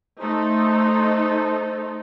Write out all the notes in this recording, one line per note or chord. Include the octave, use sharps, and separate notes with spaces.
A3 D#4 A4 C5